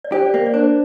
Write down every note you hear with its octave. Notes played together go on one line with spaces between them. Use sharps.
D5
G4 C5
D5
A#3
D5
D4 C5